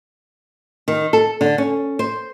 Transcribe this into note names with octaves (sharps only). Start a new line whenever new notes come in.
D#3
A4
D3
C#4
C5